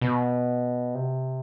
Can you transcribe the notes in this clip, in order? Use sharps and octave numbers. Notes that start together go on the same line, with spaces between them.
B2
C3